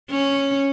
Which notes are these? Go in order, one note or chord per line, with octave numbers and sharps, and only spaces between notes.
C#4